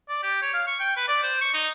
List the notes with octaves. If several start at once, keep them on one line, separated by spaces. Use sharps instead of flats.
D5
G4
C#5
F5
C#6
G5
B4
D5
C5
C#6
D#4